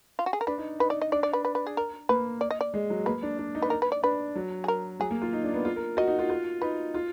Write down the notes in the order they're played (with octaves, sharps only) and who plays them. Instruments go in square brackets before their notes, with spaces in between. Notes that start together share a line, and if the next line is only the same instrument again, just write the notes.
[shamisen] F4
F#4
G#4
A#4
[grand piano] D4 [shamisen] B4
[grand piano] D#4
[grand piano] D#4 [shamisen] B4
[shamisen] D5
D#5
[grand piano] D4 [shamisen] D5
[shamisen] D5
B4
B4
B4
G#4
A#4
[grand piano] A#3 [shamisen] B4
[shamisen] D5
D#5
D5
[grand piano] G#3
F#3
[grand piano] A#3 [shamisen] B4
[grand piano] D4
D4
D#4
[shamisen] B4
A#4
B4
D5
[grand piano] D4 [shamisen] B4
[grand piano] F#3
[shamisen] G#4
A#4
[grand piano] F#3 [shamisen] G#4
[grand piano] A#3
F4
D#4
D4
B3
F4
A#4
[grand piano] F#4 [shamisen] D#5
[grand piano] D#4
F4
F4
[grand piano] D#4 [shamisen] B4
[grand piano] F4